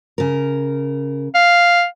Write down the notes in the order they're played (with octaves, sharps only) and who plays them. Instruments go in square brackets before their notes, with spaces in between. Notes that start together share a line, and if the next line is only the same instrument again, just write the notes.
[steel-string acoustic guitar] C#3 A#4
[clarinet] F5